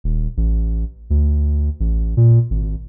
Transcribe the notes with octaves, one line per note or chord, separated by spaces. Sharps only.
D#1
A1
D2
A1
A#2
G#1